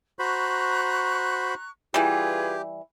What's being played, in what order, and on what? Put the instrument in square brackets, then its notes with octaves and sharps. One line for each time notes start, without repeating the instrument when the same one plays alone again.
[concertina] F#4 C5 B5 [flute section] A#5 C#6 F#6
[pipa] E3 G3 [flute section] F4 G#4 B4 [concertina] G4